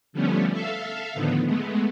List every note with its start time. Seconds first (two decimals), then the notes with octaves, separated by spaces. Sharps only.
0.13 D3 F3 G3 A3 B3 C#4
0.52 A4 E5 F5
1.13 A2 D3 D#3 F3 B3
1.44 G#3 A3 B3